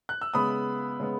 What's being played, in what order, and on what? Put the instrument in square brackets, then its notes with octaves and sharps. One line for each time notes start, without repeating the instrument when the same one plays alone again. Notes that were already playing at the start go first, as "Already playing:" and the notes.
[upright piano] F#6
E6
C#3 G#3 B3 B5 D#6
C#3 G#3 B3